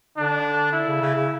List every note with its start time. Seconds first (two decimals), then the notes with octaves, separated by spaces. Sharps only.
0.17 D3 D4
0.73 E4
0.87 C#3
1.01 C#3
1.15 C#3